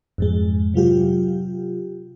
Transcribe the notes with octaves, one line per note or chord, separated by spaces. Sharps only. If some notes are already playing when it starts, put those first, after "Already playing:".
F2 G#2 G#3
C3 F#3 F4 G4